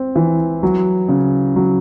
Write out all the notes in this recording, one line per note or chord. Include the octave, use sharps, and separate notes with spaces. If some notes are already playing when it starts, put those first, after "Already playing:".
Already playing: C4
E3
F#3
C#3
F#3